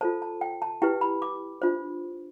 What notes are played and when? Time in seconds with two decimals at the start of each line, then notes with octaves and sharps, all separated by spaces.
0.01 F4 A4 C5 A5
0.22 A5
0.41 G5
0.62 A5
0.82 E4 G4 B4 G5
1.01 B5
1.22 D6
1.62 D4 F4 C5